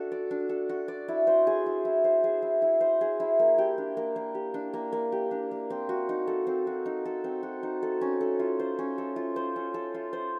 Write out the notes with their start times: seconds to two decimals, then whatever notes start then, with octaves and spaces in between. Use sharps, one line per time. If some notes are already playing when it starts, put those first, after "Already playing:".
Already playing: D4 F#4 A4
0.12 D5
0.31 D4
0.49 A4
0.69 F#4
0.88 D5
1.08 E4
1.27 C5
1.47 G#4
1.66 E4
1.85 E4
2.04 C5
2.24 G#4
2.42 E4
2.62 E4
2.81 C5
3.01 G#4
3.20 E4
3.40 A#3
3.58 G4
3.78 D4
3.97 A#3
4.16 A#3
4.35 G4
4.54 D4
4.74 A#3
4.93 A#3
5.12 G4
5.31 D4
5.51 A#3
5.70 C4
5.89 F#4
6.09 D#4
6.27 A4
6.47 C4
6.67 F#4
6.86 D#4
7.06 A4
7.24 C4
7.43 F#4
7.63 D#4
7.83 A4
8.01 C#4
8.21 A4
8.39 F4
8.59 C5
8.79 C#4
8.98 A4
9.16 F4
9.36 C5
9.56 C#4
9.74 A4
9.94 F4
10.13 C5